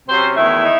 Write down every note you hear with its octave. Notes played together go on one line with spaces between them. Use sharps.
C3 F#3 C4 C#4 C5
E2 D#3 A3 E4 E5
D#4